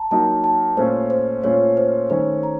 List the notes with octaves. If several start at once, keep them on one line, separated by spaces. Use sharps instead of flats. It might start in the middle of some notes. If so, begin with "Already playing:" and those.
Already playing: A5 A#5
F#3 A#3 D#4 F#4 A5
A5
A#2 A3 C#4 F4 C5
C5
A#2 A3 C#4 F4 C#5
C5
D#3 A3 C#4 C5
A#5